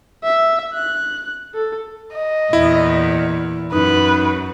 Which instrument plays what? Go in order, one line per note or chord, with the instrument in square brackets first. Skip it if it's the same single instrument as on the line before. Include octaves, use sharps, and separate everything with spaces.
[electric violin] E5
F#6
A4
[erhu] D#5
[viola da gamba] E2 A#2 [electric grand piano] E4
[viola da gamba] F#2 [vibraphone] D#4 [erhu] B4